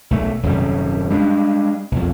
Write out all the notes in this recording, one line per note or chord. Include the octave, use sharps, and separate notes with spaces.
B1 A3
D#1 F#2 C3 G3
G3 G#3 D4
B1 F2